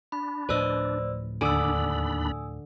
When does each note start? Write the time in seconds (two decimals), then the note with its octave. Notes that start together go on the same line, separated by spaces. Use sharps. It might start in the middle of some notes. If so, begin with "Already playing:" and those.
0.12 D4 B5
0.49 D2 A2 F3 B4 C5 D5 D#5 E6
1.41 D#2 D3 D4 D5 G#5 B5 D#6 E6